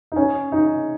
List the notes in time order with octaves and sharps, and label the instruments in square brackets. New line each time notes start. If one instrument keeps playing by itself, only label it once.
[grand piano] D#4
C#4
D#4